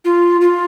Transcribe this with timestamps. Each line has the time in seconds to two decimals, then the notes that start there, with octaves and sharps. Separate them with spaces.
0.05 F4
0.41 F4